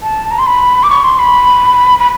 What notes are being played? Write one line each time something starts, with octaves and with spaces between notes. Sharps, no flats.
A5
A#5
C6
B5
D6
C#6
C6
B5
B5